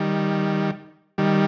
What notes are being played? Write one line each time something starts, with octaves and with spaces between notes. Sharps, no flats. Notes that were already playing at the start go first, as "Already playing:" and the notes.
Already playing: D#3 G3
D#3 G3